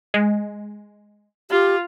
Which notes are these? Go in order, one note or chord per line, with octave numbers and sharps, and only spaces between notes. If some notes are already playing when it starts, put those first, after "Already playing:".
G#3
F4 G4